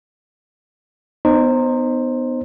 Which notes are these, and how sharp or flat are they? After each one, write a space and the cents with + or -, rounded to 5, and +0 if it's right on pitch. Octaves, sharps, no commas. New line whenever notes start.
B3 +15 D#4 -20 C5 +15